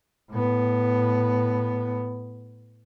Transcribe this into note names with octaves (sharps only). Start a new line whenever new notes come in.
A2 B3